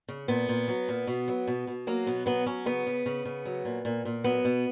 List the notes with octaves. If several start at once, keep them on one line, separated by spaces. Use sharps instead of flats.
C#3
A#2 B3
A#2
F#3
A#2
B2
F#3
B2
B2
F#3 A#3
B2 B3
F#3 B3
F#3 C#4
C#3 B3
C#3
C#3
C#3
F#3
A#2
A#2
A#2
F#3 B3
B2